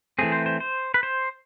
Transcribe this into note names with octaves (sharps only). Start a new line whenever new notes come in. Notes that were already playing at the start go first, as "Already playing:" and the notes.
E3 A3 C4 G#4
C5
C5
C5
B4
C5